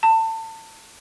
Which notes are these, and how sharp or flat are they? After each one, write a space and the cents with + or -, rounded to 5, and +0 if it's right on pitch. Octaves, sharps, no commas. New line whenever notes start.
A5 +30